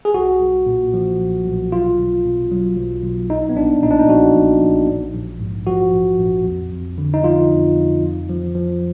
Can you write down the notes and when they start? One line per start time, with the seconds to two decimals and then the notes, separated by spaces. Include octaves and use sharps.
0.05 G#4
0.14 B1 F#4
0.41 B1
0.66 A#2
0.94 F3
1.19 B1
1.45 B1
1.72 B1 F4
1.99 B1
2.25 B2
2.51 F#3
2.77 B1
3.03 B1
3.30 A#1 D#4
3.49 B3
3.55 A#1 D4
3.83 A#2 D#4
3.91 D4
3.99 D#4
4.08 F3 F#4
4.34 A#1
4.61 A#1
4.88 A#1
5.14 A#1
5.40 G#2
5.66 F3 F#4
5.92 A#1
6.19 A#1
6.45 F2
6.72 F2
6.98 D3
7.14 D#4
7.23 F3 F4
7.50 F2
7.77 F2
8.03 F2
8.29 F3
8.55 F3